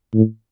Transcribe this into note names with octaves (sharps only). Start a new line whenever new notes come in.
A2